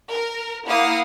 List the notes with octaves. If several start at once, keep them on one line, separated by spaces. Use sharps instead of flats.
A#4
A#3 E4 F5 F#5 D#6